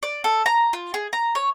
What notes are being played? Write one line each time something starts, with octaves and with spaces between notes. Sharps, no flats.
D5
A4
A#5
F4
G#4
A#5
C#5